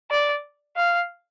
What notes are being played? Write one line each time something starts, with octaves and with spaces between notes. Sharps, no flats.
D5
F5